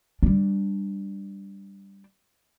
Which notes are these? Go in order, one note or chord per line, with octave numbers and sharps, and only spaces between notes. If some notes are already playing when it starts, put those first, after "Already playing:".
G3 D4